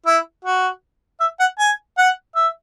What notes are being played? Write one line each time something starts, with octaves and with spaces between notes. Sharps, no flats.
E4
F#4
E5
F#5
G#5
F#5
E5